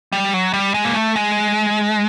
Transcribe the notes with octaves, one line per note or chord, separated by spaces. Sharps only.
G3
F#3
G3
G#3
A#3
A3
G#3